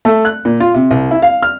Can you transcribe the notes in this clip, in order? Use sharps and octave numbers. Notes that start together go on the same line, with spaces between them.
A3
F#6
A#2
F4
C3
C2
E4
F5
F6